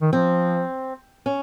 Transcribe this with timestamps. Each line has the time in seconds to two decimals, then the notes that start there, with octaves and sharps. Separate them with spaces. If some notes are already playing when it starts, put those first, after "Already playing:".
0.01 D#3
0.12 F3 C4
1.26 C#4